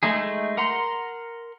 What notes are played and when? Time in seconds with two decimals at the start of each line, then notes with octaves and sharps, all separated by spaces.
0.03 G#3 A3 D#4 G#4
0.57 A#4 F#5 A#5 C6